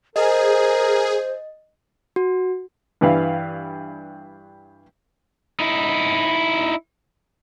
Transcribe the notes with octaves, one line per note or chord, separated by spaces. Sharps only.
G#4 A#4 C5 D#5
F#4
G2 E3 B4 F5
D#4 E4